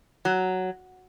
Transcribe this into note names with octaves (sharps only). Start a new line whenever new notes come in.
F#3